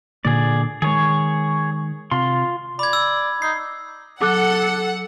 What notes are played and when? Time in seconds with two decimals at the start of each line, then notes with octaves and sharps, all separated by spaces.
0.25 A#2 D3 A#3 G#4 D5
0.82 D#3 G#3 G#4 C#5
2.11 C3 F4 C6
2.79 D5 B5 G#6
2.93 E6
3.42 D#4 C7
4.22 F#3 A4 F#5 D6 F#6